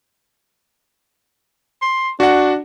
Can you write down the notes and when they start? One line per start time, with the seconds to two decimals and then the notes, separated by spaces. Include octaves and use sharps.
1.82 C6
2.20 D4 F#4 F#5